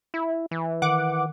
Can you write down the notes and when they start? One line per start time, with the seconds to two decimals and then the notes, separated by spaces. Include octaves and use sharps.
0.14 E4
0.51 E3
0.82 D#3 F#5 D6